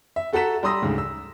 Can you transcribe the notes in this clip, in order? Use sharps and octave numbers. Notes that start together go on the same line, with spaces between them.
E5
F#4 A4 F#5 A#5 B6 E7
G3 A#5 C6 D#6 E6 A#6
D2 G#2 C#3
E6